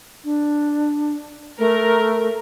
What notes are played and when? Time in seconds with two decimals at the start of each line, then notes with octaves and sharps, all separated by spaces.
0.24 D4
1.59 A3 A#4